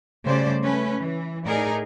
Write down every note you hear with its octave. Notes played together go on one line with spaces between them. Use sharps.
C#3 G3 A3 C5 D5
A3 C#4 B4
E3
A2 D#4 G#4 A#4 D5